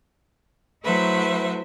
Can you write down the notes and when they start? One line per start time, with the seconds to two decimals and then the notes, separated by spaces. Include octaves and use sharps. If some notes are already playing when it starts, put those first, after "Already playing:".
0.85 F#3 A3 E4 B4 C5 E5